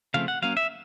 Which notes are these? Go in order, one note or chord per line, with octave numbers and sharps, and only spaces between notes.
C#3 F3 A3 C4 F5
F#5
F#3 A#3 C#4 F5
E5